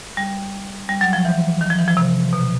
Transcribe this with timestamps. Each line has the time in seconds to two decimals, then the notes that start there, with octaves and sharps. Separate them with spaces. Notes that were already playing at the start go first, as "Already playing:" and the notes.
0.17 G3
0.89 G3
1.01 F#3
1.13 F3
1.25 E3
1.61 D#3
1.70 F3
1.79 E3
1.88 F3
1.97 C3
2.33 B2